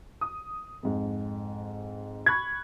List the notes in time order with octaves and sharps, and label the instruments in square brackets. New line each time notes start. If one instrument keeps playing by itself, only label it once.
[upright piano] D#6
F2 G#2
B5 C#6 F#6 G#6